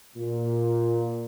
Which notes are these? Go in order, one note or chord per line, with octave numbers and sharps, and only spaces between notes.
A#2